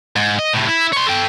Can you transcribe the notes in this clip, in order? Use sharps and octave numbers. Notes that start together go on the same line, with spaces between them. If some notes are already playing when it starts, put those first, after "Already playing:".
G#2
D#5
A2 C3
E4
C#5 C6
A4 G5